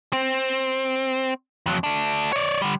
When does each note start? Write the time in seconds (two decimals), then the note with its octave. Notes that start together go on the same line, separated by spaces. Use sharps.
0.13 C4
1.66 F2 F#3
1.84 A3 D4
2.33 C#5 D5
2.62 D3 G3